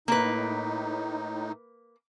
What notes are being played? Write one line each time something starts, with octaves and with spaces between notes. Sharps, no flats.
A2 A#3 D#4 B4